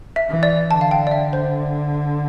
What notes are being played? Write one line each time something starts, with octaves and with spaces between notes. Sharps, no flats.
E5
E3
D5
D3 A5
F5
G5
D5
E5
C5